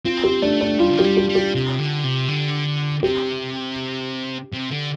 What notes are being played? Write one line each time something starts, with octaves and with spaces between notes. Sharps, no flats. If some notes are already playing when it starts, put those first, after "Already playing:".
C4 F4
G4
A3 D4
D4
G3 F4
D3
F3 G4
G3
G4
G3
G4
C3
D3
C3
D3
C3 G4
C3
D3